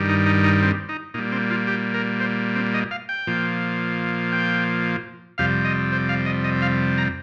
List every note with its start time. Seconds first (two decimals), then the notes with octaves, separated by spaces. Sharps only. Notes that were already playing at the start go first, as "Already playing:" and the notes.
Already playing: G2 D#3 G3
0.09 D#4
0.26 D#4
0.44 D#4
0.62 C4
0.89 D#4
1.14 A#2 G3 D#4
1.32 C4
1.51 F4
1.68 G4
1.94 A#4
2.20 C5
2.56 C4
2.74 D#5
2.91 F5
3.09 G5
3.27 A#2 F3
4.32 G5
5.38 F2 C3 G3 F5
5.65 D#5
5.92 C5
6.09 F5
6.26 D#5
6.44 D#5
6.62 F5
6.98 A#5